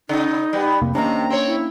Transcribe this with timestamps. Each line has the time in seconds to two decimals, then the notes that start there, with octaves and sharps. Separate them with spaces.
0.09 C#3 D#4
0.53 G3 B3
0.82 F2 C3 A#3
0.95 C3 D#3 A#3 C#4 D4 A#5
1.30 C4 C#5
1.47 E4